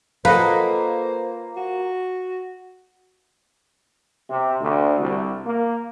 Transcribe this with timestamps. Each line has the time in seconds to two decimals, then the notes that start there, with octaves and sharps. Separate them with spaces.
0.25 A#3 F4 A4 B4 C5 D#5 F#5
1.57 F#4
4.29 C3
4.60 D2
5.00 C2
5.45 A#3